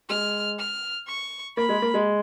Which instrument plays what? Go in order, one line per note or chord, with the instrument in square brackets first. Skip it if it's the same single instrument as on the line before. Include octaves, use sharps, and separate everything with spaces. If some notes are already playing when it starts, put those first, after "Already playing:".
[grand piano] G#3 [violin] F6
[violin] F6
C#6
[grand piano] A#3 [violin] B5
[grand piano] G#3
A#3
G#3